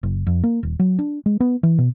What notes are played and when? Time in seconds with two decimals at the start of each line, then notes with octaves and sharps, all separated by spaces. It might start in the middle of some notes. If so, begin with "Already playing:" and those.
0.03 F#1
0.27 F2
0.44 A#3
0.63 D#1
0.79 F#3
0.99 D4
1.26 G#3
1.40 B3
1.63 E3
1.78 B2